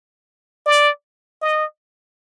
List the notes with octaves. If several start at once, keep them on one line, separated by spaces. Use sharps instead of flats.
D5
D#5